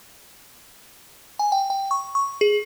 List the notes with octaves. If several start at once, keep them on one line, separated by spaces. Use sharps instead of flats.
G#5
G5
G5
C#6
C#6
G#4